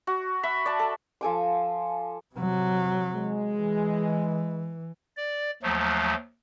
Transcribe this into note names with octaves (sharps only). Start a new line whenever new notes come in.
F#4
E5 B5
D5 A5
A4
F3 A4 G#5 D6
C3 F#3
G#3
E3
D5
D#2 F3 F#3 A3